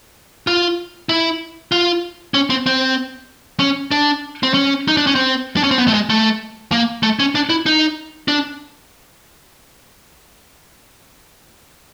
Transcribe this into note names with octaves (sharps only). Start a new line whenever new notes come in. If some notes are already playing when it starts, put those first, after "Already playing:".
F4
E4
F4
C#4
C4
C4
C#4
D4
C4
C#4
D#4
D4
C#4
C4
D4
C#4
C4
B3
A3
G#3
A3
A#3
A3
C#4
D4
E4
D#4
D4